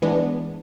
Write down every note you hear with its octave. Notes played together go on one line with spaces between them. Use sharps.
E3 G#3 B3 D4